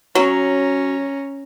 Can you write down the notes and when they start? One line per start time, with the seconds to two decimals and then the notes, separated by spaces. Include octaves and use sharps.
0.15 F#3 C#4 F#4 A#5